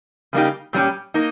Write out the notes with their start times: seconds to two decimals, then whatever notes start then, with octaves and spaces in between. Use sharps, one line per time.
0.33 C#3 G3 A#3 D#4 G4
0.73 A#2 G3 C#4 G4
1.14 A#3 D#4